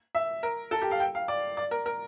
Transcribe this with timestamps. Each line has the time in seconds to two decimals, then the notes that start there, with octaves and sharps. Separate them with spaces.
0.15 E5
0.43 A#4
0.71 A4
0.82 G4
0.91 F5
1.00 G5
1.15 F5
1.28 D5
1.57 D5
1.71 A#4
1.86 A#4